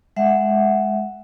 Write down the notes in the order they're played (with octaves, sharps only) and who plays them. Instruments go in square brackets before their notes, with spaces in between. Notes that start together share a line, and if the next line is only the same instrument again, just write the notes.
[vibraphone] G#3 E5 F#5